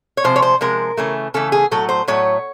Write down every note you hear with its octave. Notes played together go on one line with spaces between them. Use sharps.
C#5
C3 F3 G#3 C5
C#5
C5
C3 F3 G#3 A#4
C#3 E3 A3
C#3 E3 A3 A4
G#4
A2 F#3 A3 A4
C5
A2 F#3 A3 C#5